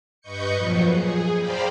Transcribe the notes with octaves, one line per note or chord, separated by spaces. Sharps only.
G2 B4 D#5 C#6 G6 C#7
F2 A#2 F3 F#3
G#4
C5 D5 F5 G5 A#5 B5